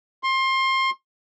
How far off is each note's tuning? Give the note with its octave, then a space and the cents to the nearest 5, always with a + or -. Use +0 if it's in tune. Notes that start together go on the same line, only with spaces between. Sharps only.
C6 +25